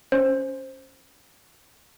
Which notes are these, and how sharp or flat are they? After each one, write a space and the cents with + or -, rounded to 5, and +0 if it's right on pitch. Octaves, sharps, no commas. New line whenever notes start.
C#4 +0 C5 +10